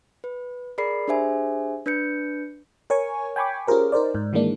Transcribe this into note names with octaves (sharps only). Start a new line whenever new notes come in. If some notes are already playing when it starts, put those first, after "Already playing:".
B4
G#4 A#4 D5 B5 C7
D4 G4 G#4 C5 E5 G#5
D4 B4 G6 C#7
A#4 C#5 G#5 C#6
G5 G#5 B5 C#6 D6
C#4 F4 G4 G#4 A#4 C5
D#4 A#4 C5 D5
G#2
D#3 E3 G#3 A#3 D4